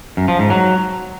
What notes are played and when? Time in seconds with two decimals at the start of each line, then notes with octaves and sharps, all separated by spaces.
0.17 F#2
0.28 F3
0.39 G#2
0.50 F#3